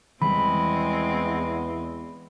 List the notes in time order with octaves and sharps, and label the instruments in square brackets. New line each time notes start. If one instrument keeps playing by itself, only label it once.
[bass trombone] E2 [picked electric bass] D#3 E3 G3 [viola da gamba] G#3 C4 [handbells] B5